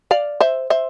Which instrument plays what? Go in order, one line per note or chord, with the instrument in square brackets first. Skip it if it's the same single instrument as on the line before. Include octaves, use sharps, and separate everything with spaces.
[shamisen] D5 F5
C5 E5
C5 E5